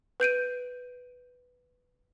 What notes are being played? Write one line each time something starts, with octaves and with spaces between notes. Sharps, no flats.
B4 G6 D7 D#7